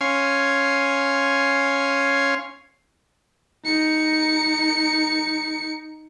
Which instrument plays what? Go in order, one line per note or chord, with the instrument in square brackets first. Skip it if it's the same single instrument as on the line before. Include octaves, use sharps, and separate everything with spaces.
[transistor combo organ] C#4 F5 G#5 C6
[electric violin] D#4 C#7